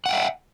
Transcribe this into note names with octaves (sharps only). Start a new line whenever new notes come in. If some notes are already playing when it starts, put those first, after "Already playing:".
E5 F#5 G5